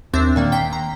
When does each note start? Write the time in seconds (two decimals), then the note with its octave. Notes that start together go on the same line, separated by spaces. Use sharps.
0.14 D#2 C4 D4 E5
0.36 A#2 D#3 A#3
0.52 G5 B6 C7
0.73 A#5